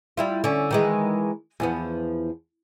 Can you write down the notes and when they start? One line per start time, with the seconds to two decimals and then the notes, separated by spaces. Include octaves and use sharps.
0.17 G3 E4 F4
0.44 D3 C#4
0.71 D#3 E3 G#3
1.60 E2 F3 B3